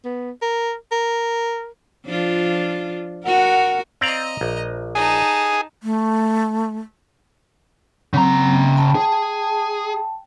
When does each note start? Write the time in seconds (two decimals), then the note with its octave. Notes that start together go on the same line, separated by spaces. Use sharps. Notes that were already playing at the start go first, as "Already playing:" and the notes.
0.05 B3
0.42 A#4
0.92 A#4
2.06 F3 D4 F4
3.25 F#4 A#4 F#5
4.01 C4 D5 D#5 F5 A#5
4.41 A#1
4.95 D#4 G#4 A5
5.83 A3
8.14 C#3 F#3 C4 A#5
8.77 G5 A5
8.95 G#4